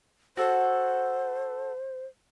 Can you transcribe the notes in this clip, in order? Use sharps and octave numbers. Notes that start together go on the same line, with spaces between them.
F#4 A4 C5